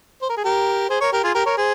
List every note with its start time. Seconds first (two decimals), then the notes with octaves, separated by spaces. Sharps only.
0.22 C5
0.29 A#4
0.37 G#4
0.44 G4 A#4
0.89 G#4 C5
1.01 A#4 C#5
1.12 G4 A#4
1.24 F4 G#4
1.35 G4 A#4
1.46 A#4 C#5
1.57 G#4 C5